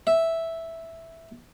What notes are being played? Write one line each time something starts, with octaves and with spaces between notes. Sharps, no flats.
E5